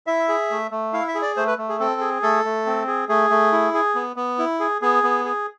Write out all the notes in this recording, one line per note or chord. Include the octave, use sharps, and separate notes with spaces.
E4 E5
G#4
A3
A3
E4 F5
E5
G#4
D5
A3 C5
B4
A3
G#4
C4 A4
G#4
A3 A4
A3
C4
G#4
A3 G#4
A3
E4
G#4
B3
B3
E4
G#4
B3 G#4
B3
G#4